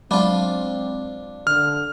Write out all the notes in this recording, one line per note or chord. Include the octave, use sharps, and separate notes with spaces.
F#3 G#3 C4 D4 F4 B5
D3 F6